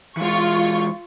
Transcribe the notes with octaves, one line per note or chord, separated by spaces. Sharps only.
E3 G#3 F4 C#6